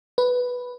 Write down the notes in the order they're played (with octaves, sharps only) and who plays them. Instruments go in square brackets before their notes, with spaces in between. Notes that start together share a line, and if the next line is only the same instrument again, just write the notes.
[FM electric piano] B4